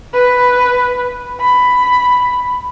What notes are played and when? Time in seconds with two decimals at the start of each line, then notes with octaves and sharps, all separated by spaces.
0.14 B4
1.41 B5